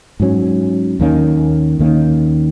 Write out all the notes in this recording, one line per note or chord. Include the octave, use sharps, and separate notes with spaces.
G#2 F#3 C#4
D#2 D#3 A#3 C#4
D#2 D#3 A#3 C#4